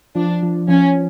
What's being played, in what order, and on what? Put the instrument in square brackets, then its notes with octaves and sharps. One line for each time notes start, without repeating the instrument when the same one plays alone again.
[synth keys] F3 [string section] D4
[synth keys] F3
[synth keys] F3 [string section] C#4